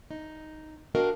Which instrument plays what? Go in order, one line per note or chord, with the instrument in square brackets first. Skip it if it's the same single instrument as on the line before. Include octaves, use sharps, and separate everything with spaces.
[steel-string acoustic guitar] D#4
D4 F#4 A#4 D#5 F5 G5